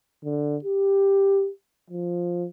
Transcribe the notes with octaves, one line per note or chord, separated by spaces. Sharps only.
D3
G4
F3